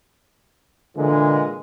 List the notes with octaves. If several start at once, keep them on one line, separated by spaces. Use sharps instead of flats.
A#2 D3 E3 G#3